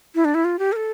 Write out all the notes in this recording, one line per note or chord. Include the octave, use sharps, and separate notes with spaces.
E4
D4
E4
F4
G4
A#4
A4